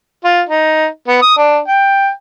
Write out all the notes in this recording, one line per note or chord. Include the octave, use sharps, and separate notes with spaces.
F4
D#4
B3
D#6
D4
G5